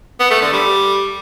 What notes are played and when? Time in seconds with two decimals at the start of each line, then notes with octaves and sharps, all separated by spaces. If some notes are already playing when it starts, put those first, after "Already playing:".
0.20 B3
0.31 A3
0.42 D3
0.53 G3